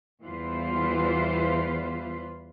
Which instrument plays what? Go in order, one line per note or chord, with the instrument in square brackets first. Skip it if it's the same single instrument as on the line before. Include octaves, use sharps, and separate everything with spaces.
[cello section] E2 E3 G3 F4 B4 C5